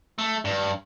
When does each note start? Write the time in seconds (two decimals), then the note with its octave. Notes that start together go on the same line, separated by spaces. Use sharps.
0.18 A3
0.45 G2